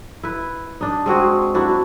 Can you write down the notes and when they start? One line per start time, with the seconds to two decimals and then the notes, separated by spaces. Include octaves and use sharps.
0.23 E4 B4
0.81 D4 D#4
1.06 G#3 C4 F#4 G#4
1.54 F#3 D4 E4 F#4